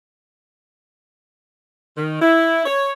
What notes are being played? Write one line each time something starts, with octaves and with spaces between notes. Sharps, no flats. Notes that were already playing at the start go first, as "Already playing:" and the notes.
D#3
E4
C#5